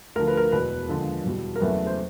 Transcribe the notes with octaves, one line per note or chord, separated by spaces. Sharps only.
D2 D3 F3 A#4
B4
A#4
E1 E2 B2 B4
D#2 D3 F3 G#3
E2 B2 G3
A#4
F#1 E2 C#3 F#3 A3 B4
C5